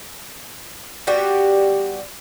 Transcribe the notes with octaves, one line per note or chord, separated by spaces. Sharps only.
G3 B3 F#4 G4